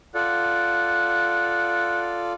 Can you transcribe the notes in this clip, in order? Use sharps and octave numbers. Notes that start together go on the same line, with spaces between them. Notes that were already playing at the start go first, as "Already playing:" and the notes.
F4 A4 D5 F#5